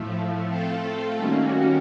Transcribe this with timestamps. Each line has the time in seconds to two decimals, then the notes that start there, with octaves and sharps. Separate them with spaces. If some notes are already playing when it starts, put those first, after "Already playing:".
Already playing: A2 F3 A3
0.44 A3 C4 F4 A4
1.17 D#3 G3 A#3 C#4 F#4